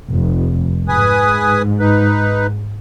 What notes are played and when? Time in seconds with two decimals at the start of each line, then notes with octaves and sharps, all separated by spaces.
0.11 F1
0.88 G#2 B4 G#5 D#6
1.80 D#4 B4